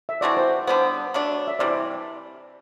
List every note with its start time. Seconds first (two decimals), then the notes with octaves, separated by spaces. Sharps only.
0.09 E5
0.21 E3 A3 C4 F#4 D5
0.37 C5
0.67 D3 G3 B3 C5
1.14 F#3 A3 D4
1.47 E5
1.59 C3 E3 G3 D5